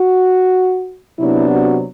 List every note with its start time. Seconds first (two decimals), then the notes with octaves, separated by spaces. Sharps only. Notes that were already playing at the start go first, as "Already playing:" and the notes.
Already playing: F#4
1.19 C3 F#3 B3 D4 E4
1.50 F#4